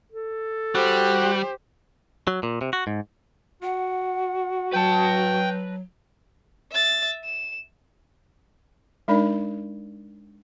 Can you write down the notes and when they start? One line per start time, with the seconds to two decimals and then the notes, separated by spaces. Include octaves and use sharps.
0.12 A4
0.75 G3 F#4 G4 C5
2.27 F#3
2.43 A#2
2.61 C3
2.73 F#4
2.87 G#2
3.63 F#4 F#5
4.73 F#3 B4 G5 A5
6.72 E5 A6
7.24 E7
9.08 G#3 D4 D#4 A#4 D5 B5